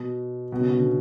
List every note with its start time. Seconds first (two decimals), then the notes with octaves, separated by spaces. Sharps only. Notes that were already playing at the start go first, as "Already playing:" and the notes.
Already playing: B2
0.52 B2
0.60 C#3
0.69 B2
0.77 D3